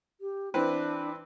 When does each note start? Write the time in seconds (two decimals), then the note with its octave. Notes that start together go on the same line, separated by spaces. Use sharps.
0.21 G4
0.54 E3 C4 D4 B4